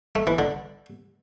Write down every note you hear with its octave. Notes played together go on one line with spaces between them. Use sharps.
A3
E3
D3